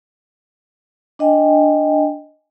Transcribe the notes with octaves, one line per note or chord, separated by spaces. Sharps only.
D4 D#5 G5 G#5